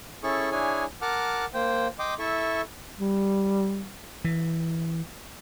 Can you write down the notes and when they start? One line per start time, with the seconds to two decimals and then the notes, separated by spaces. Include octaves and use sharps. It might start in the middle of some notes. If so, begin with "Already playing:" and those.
0.24 C#4 E4 G#4 A4 C#6
0.52 D4 E4 G#4 C#5 G#5
1.02 A#4 F#5 A5 D6 F6
1.54 A#3 C5 G5
1.99 D#5 G5 C6 D6
2.19 E4 A4 E5 C#6
2.99 G3
4.25 E3